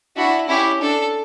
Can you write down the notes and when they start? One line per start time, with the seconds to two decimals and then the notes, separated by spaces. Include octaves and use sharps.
0.17 D4 E4 F#4
0.49 C#4 E4 G4
0.81 D4 A4